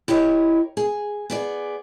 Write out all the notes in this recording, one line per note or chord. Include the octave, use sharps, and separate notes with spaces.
E4 G4 A#4 C#5 D#5
G#4
B3 G#4 D5